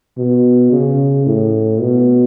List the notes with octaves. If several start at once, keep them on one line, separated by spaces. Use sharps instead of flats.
B2
C#3
A2
B2